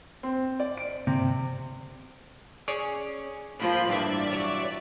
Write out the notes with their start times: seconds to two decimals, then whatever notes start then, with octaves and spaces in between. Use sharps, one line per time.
0.23 C4
0.60 D5
0.78 D7
1.07 C3
2.68 C#4 G#4 C#5 D5
3.60 A2 F3 A#3 F4 B5
3.89 G2 E3 D5 E5
4.31 F#3 C#5